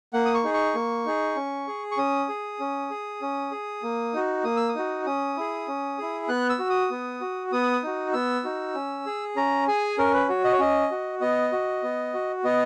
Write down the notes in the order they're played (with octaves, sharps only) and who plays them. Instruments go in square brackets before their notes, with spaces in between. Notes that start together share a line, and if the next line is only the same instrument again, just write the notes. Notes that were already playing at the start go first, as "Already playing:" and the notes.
[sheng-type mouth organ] A#3 F#5
D#6
C#6
D#4 G#4
C#6
A#3
D#4 G#4
C#4
G#4
C#6
C#4 D#6
G#4
C#4
G#4
C#4
G#4
A#3
D#4 F#4
A#3 D#6
E6
D#6
D#4 F#4
C#4 D#6
E4 G#4
C#4
E4 G#4
B3 F#6
E6
F#4
D#6
B3
F#4
B3 D#6
D#4 F#4
B3 E6
D#4 F#4
C#4
G#4
C#4 A#5
G#4 G#5
C#4 A#4
B4
F#4 C#5
D#5
C#5
C#4 D#5
F#4
B3 D#5
F#4
B3
F#4
B3 D#5